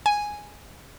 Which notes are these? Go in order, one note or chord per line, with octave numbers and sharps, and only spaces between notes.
G#5